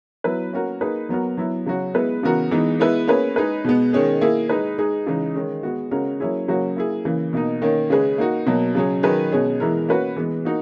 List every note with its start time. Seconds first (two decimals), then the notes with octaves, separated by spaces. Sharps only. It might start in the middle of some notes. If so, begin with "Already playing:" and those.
0.24 F#3 B3 E4 B4
0.53 A#3 C#4 F#4 A#4
0.81 A#3 D#4 G#4 B4
1.09 F#3 B3 F#4 A#4
1.37 F#3 B3 E4
1.66 C#3 F#3 C#4 F#4
1.94 G#3 B3 E4 B4
2.23 C#3 E3 B3 F#4 A#4
2.51 E3 G#3 B3 D#4
2.80 G#3 B3 E4 B4
3.08 A#3 C#4 G#4 B4
3.36 G#3 D#4 G#4 B4
3.65 B2 G#3 B3
3.93 D#3 G#3 C#4 G#4
4.21 A#3 E4 G#4
4.49 G#3 D#4 G#4 B4
4.78 G#3 D#4 G#4
5.07 C#3 E3 G#3 D#4
5.35 D#3 G#3 C#4
5.63 G#3 B3 F#4
5.91 C#3 G#3 C#4 F#4 A#4
6.20 F#3 A#3 C#4 E4 G#4
6.48 C#3 F#3 A#3 C#4 F#4
6.76 A#3 E4 G#4
7.05 C#3 E3 A#3
7.33 B2 A#3 D#4
7.62 D#3 A#3 C#4
7.90 C#3 G#3 C#4 G#4 B4
8.18 A#3 D#4 F#4
8.47 B2 F#3 A#3
8.75 C#3 F#3 C#4 G#4
9.03 D#3 F#3 C#4 G#4 B4
9.32 B2 G#3 C#4 G#4
9.60 E3 G#3 B3 E4 A#4
9.88 A#3 C#4 F#4 B4
10.16 E3 G#3 B3
10.45 A#3 D#4 F#4